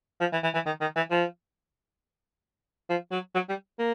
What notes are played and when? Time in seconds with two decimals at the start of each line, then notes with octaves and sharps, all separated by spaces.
0.21 F3
0.33 E3
0.44 E3
0.54 E3
0.66 D#3
0.81 D#3
0.96 E3
1.11 F3
2.89 F3
3.12 F#3
3.35 F#3
3.49 G3
3.79 A#3